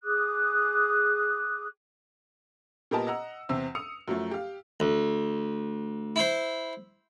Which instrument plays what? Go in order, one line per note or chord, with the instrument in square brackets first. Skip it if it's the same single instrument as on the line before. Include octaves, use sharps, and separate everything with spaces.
[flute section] G#4 D6 D#6 F#6
[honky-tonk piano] A#2 B3 G4 A#4 D#5 A5
D#5 F#5 A#5 E6
E2 C3 C4 E6
D#6 C#7 F7
F#2 F3 F#3 A3
G4 F5
[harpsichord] D2
E4 C5